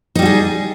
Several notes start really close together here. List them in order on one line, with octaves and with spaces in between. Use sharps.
D#4 G3 F#4 G#4